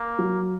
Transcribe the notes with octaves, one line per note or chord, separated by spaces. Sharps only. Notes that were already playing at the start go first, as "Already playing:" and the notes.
Already playing: A#3
F#3